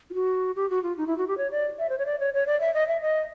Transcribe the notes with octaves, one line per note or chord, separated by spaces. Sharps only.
F4
F#4
G4
F#4
F4
D#4
E4
F#4
G4
C#5
D5
E5
C5
C#5
D5
C#5
C#5
D5
E5
D#5
E5
D#5